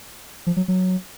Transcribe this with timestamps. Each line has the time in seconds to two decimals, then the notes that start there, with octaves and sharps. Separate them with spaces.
0.47 F3
0.57 F#3
0.68 F#3